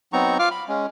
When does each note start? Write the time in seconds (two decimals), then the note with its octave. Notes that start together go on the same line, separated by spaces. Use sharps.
0.13 F#3 B3 C4 D#4 A#5 C#6
0.39 F4 F5 D6 F6
0.51 B5
0.68 G#3 C#4